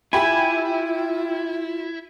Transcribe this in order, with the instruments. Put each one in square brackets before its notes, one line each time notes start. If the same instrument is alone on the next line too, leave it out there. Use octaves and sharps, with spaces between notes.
[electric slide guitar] E4 [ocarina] F4 [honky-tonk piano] G4 B5 [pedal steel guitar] G#5